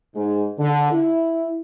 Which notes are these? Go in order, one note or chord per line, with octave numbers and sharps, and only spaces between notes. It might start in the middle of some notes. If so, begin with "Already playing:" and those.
G#2
D3
E4